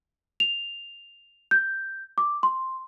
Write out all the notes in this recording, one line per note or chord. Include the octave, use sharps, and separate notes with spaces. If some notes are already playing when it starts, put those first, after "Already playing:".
F7
G6
D6
C6